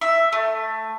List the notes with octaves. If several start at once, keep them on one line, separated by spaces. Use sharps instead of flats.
E5
A3